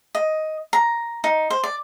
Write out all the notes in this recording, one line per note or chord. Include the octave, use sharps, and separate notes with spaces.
D#5
A#5
D#4
C5
D5